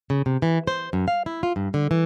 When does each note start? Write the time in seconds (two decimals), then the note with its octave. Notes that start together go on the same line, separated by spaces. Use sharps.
0.10 C#3
0.26 C3
0.42 E3
0.67 C5
0.93 F#2
1.08 F5
1.26 E4
1.43 F4
1.56 G2
1.74 D3
1.91 E3